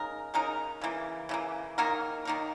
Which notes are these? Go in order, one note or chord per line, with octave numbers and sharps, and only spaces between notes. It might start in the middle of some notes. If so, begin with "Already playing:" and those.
Already playing: C#3 G#3 D#4 A#4
C#3 G#3 D#4 A#4
C#3 E3 A#3
C#3 E3 A#3
D#3 A#3 D#4 A#4
D#3 A#3 D#4 A#4